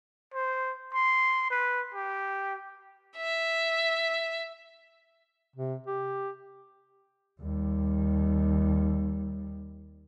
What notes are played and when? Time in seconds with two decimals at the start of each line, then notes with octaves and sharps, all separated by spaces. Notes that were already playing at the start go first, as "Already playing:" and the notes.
0.34 C5
0.94 C6
1.51 B4
1.95 G4
3.16 E5
5.56 C3
5.87 G4
7.41 D#2 G3